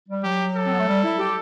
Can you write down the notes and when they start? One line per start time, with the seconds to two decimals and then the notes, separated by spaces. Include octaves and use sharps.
0.09 G3
0.24 F#3 G4
0.56 A4
0.65 C4
0.72 B3
0.80 A3
0.87 G3
1.04 E4
1.19 G4